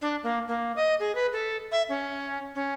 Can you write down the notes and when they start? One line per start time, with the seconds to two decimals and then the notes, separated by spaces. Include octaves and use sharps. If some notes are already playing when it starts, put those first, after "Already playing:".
0.02 D4
0.23 A#3
0.48 A#3
0.76 D#5
1.00 G#4
1.15 B4
1.33 A4
1.72 E5
1.89 C#4
2.55 C#4